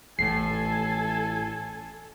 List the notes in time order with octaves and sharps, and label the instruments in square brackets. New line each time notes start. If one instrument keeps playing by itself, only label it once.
[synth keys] A1 A2 [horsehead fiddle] A4 G#5 [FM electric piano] C7